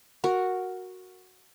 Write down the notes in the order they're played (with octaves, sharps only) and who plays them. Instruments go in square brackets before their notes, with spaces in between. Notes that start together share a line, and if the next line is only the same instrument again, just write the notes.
[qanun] F#4 A#4